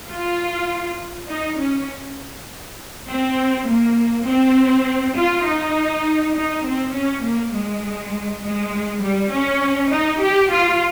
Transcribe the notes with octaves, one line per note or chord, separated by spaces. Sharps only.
F4
D#4
C#4
C4
A#3
C4
F4
D#4
D#4
C4
C#4
A#3
G#3
G#3
G3
C#4
D#4
G4
F4